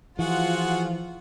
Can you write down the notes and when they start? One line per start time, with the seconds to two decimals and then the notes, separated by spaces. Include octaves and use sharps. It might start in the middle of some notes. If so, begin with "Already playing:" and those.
0.19 E3 F3 F4 F#4 G#4 F#5